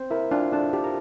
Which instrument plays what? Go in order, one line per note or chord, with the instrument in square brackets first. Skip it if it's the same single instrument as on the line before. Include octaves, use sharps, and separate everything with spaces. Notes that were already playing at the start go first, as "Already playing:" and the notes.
Already playing: [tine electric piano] C4 C5
[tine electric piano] E4 E5 [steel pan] A#4
[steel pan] D4 [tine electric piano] F4 F5
[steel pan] D4 [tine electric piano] A4 A5
[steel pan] G4
[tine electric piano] A#4 A#5